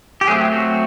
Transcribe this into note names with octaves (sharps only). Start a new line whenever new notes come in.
G4
F#3 A3 C4 G#4
F#4